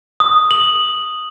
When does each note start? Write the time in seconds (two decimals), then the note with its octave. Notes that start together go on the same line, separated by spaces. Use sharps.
0.20 D#6
0.51 F#7